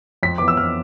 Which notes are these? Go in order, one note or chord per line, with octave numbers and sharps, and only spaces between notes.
F2 B6
E3 B3 D6
E6
F2 F6